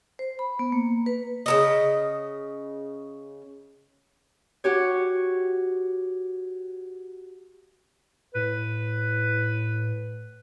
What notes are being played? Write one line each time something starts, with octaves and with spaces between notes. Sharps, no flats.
C5
B5
B3
A#3
B4
C#3 E3 D#5
F#4 G4 C#5
A2 B4